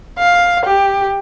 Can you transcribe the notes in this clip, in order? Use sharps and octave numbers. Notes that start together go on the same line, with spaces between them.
F5
G4